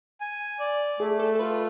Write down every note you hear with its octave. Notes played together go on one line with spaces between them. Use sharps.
G#5
D5
A3 G#4
A4
A4
F4 B4